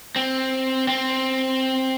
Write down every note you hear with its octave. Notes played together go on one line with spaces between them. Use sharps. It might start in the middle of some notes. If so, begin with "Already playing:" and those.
C4
C4